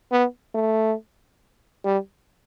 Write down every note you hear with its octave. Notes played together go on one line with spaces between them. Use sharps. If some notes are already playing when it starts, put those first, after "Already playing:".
B3
A3
G3